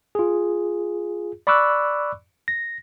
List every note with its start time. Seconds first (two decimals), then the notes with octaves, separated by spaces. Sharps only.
0.15 F4 G#4
1.47 D5 B5 C#6 D6 E6 F#6
2.48 A#6